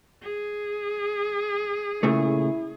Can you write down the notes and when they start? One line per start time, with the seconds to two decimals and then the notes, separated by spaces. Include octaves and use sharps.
0.23 G#4
2.03 A#2 C#3 A3 E4